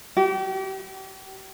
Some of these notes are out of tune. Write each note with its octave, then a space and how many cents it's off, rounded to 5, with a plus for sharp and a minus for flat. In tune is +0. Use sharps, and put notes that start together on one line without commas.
G4 -35